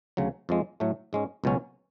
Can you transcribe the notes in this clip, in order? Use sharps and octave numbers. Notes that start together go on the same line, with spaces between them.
D2 C#3 F#3
F2 F3 G#3
A2 F#3 A3
G#2 G#3 C#4
C#2 B2 F#3 C#4